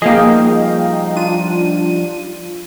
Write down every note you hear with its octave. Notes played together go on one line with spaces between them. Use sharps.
F3 G3 A#3 D#4 G#4 D#5 F5 G5
D4 F4 D#7